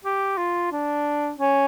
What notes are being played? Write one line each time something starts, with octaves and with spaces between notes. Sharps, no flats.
G4
F4
D4
C#4